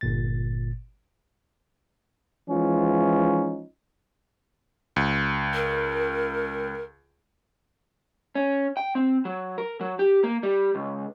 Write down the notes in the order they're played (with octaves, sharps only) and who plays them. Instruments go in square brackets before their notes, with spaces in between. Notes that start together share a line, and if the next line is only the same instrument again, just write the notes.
[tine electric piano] G1 A#2 A6
[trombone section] E3 F3 G#3 C#4 D#4 F4
[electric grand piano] C#2
[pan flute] A#4
[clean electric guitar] C#4
G5
C4
F#3
A#4
F#3
G4
A#3
G3
C#2